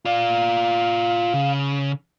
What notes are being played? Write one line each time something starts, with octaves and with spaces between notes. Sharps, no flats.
F4 D5 F5
C#3